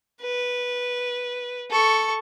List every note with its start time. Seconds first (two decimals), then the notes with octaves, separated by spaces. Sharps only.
0.21 B4
1.71 A4 C#6